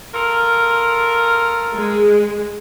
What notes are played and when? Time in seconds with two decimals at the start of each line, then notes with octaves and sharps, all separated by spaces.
0.13 F4 A4 A#4
1.74 G#3